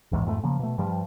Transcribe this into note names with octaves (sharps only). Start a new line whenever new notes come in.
A1 E2 G#2
F2 G#2 G3 A3
C#3 F3 A#3
B2 A3
G2 F3 G3